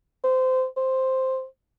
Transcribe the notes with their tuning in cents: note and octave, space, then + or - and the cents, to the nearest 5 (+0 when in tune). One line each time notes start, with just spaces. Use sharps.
C5 -20
C5 +0